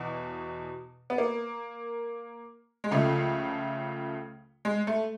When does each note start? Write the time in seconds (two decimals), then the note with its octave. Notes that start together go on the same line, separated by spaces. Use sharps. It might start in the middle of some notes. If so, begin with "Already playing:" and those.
Already playing: E2 B2
1.10 B3
1.18 A#3
2.84 G#3
2.91 C#2 C#3 F3 A3
4.65 G#3
4.87 A3